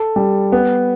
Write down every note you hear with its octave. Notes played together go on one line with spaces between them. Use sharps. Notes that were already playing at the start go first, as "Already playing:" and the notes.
Already playing: A4
G3
B3